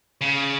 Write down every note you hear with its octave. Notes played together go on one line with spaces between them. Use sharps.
C#3